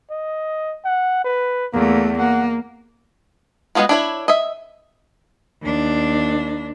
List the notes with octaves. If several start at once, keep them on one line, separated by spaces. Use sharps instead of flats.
D#5
F#5
B4
E2 A3 A#3
A#3 F#5
G#3 A#3 B3 F4 F#4
D4 E4 C#5
D#5 E5
D#2 D4